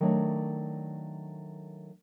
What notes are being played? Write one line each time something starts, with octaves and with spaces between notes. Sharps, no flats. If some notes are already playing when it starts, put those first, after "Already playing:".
D#3 F#3 A3 D4 C#5